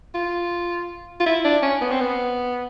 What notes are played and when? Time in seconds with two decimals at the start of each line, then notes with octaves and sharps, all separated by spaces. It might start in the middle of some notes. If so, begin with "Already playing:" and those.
0.14 F4
1.20 F4
1.26 E4
1.44 D4
1.62 C#4
1.81 B3
1.91 C4
2.01 B3